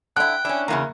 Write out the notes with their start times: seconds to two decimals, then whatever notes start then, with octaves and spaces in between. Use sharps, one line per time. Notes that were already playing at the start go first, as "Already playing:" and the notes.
0.16 D3 E4 G5 F#6
0.45 C#4 D4 E4
0.68 E2 A#2 C#3 A#3 E4 A#5